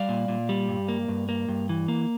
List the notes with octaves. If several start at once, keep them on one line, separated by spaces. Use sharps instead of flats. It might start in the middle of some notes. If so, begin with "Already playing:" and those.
Already playing: G3 D5 F5
A#2
A#2
G3
G2
A#3
G2
A#3
G2
E3
A#3